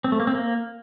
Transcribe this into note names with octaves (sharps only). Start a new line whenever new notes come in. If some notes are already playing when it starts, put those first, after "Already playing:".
C4
A3
A#3
C4
A#3